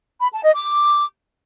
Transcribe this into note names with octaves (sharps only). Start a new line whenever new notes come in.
B5
A5
D#5
D6